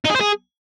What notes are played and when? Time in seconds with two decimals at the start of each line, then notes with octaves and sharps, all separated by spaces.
0.05 D#4
0.10 G#4
0.15 C5
0.21 G#4